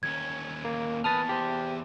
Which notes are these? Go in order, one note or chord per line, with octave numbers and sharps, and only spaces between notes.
D#2 C#4 G#6
A#3
E2 B4 A5 D#6 F6 A6
G4 C5